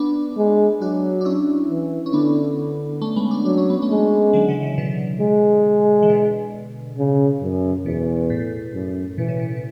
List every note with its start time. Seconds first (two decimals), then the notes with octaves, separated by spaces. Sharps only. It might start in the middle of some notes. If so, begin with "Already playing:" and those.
Already playing: B3 D4
0.37 G#3
0.81 F#3 D4 F#4
1.21 D4
1.25 C#4 E4
1.69 E3
2.06 C#4
2.13 D3 B3 D4
3.01 A3 C#4
3.16 G#3 B3
3.31 B3 D4
3.45 F#3 D4
3.58 C#4
3.70 B3
3.82 A3 C#4
3.90 G#3
4.33 D3 F#3
4.48 C#3 E3
4.63 C#3 E3
4.74 C#3
4.78 B2 D3
5.21 G#3
6.02 E3
6.10 B2 D3
6.97 C#3
7.42 F#2
7.85 E2 B2
8.30 A2
8.74 F#2
9.18 B2 E3
9.28 C#3
9.40 B2
9.53 B2